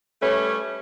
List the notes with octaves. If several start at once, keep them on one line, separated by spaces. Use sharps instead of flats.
G3 A3 C#4 B4 C#5